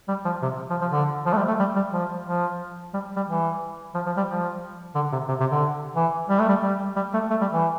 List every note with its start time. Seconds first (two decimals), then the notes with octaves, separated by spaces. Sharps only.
0.08 G3
0.25 F3
0.42 C3
0.70 F3
0.81 F3
0.92 D3
1.26 F3
1.33 A3
1.37 G3
1.48 A3
1.59 G3
1.76 G3
1.93 F3
2.26 F3
2.94 G3
3.16 G3
3.28 E3
3.94 F3
4.06 F3
4.17 G3
4.28 F3
4.95 D3
5.12 C3
5.28 C3
5.40 C3
5.51 D3
5.96 E3
6.29 G3
6.40 A3
6.49 G3
6.63 G3
6.96 G3
7.14 A3
7.30 A3
7.41 G3
7.53 E3